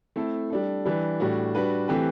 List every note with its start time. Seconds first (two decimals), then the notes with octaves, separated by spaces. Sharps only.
0.16 A3 C4 E4 A4
0.50 G3 D4 A4
0.85 E3 G3 D4
1.20 A2 G3 D4 F#4
1.55 G3 D4 F#4 B4
1.88 E3 A3 C4 G4 B4